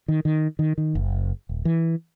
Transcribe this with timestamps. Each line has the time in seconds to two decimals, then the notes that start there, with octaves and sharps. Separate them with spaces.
0.08 D#3
0.25 D#3
0.59 D#3
0.78 D#3
0.95 F#1
1.49 D#1
1.65 E3